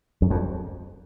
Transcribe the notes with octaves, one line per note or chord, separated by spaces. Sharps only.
F#2
F2